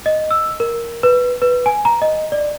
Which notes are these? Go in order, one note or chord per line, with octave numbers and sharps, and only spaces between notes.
D#5
E6
A#4
B4
B4
G#5
A#5
D#5
D5